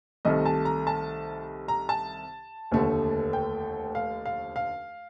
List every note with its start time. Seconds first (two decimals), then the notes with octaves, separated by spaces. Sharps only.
0.25 C2 C3 D#3 A3 D#5
0.46 A5
0.65 A#5
0.87 A5
1.68 A#5
1.89 A5
2.71 F1 D#2 D3 A3
3.33 G5
3.95 F5
4.26 F5
4.56 F5